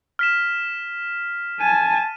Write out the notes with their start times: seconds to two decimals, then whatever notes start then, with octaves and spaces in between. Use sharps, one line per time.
0.19 F6 B6 E7
1.61 G#5 A5 D#7